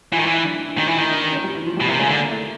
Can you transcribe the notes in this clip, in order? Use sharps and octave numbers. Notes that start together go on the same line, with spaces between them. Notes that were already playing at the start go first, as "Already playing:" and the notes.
E3 F4
D#3
E4
E3
E4
D4
D4
D#3 D#4
E3 E4
D#3 D#4
D4
D4
C#4
G3
E3
F3
G3
B2
C3 A#3
C#3 G#3
D3 A3
A#3
A3